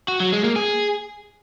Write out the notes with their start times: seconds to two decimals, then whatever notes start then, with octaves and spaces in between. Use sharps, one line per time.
0.08 F#4
0.20 F#3
0.32 G#3
0.44 A#3
0.56 G#4